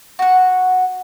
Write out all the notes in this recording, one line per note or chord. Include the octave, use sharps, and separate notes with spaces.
F#4 F#5